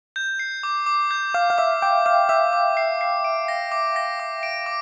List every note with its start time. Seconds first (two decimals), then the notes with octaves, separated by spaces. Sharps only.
0.16 G6
0.39 C7
0.63 D6
0.86 D6
1.11 G6
1.34 F5 D6
1.50 F5
1.58 E5 D6
1.82 G5 D6
2.06 F5 D6
2.29 E5 D6
2.53 D6
2.77 C7
3.01 C7
3.24 D7
3.48 A#6
3.72 D6
3.96 A#6
4.20 D6
4.43 D7
4.66 D6